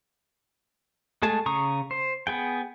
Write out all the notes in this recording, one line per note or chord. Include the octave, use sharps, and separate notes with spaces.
G#3 A3 G#4 A5
C#3 A#5 C#6 D#6
C5
B3 G#4 G5